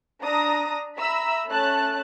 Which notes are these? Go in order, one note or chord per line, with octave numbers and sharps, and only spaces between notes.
D4 A#5 D#6 A#6
E5 A#5 B5 E6
A3 C#4 A5 F#6